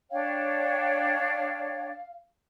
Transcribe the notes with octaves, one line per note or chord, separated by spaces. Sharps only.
D4 C#5 F5 G5